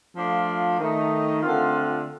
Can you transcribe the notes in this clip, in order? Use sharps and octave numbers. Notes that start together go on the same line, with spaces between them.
F3 A3 D4 F4
D#3 A3 D#4
D3 A3 C4 F4